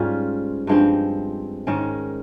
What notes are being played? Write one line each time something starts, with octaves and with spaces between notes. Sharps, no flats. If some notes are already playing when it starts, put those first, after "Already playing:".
Already playing: G#2 G3 C#4 F4
G2 F3 G#3 C4
G#2 D#3 G#3 C#4